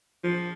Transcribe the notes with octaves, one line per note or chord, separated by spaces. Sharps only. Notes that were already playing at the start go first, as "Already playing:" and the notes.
F3